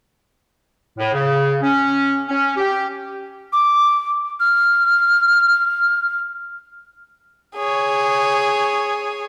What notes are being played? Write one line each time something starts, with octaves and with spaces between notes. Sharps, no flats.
A2
C#3
C#4
C#4
G4
D6
F6
G#4 C#5